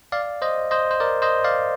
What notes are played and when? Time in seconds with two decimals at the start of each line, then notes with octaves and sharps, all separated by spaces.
0.12 D5 F5
0.42 C5 D#5
0.71 C5 D#5
0.91 C5
1.00 A#4 D5
1.22 C5 D#5
1.44 D5 F5